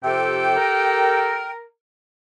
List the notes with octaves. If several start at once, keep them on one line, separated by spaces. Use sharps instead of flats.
F2 C3 G4 A4 G5
A#4